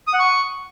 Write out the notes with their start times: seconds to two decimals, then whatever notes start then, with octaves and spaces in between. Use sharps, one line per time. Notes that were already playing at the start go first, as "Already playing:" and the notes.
0.07 D#6
0.13 F#5
0.20 C#6